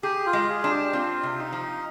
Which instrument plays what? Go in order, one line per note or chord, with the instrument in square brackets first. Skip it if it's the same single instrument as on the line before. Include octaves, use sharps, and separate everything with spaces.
[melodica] G4 [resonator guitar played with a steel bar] G#4
[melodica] F4
[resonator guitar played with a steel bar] G#3
[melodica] G#4
[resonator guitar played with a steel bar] D4 [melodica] F4
[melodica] G4
[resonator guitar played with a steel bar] C4 [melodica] F4
[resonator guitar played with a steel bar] C3
[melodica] D#4
[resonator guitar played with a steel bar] F3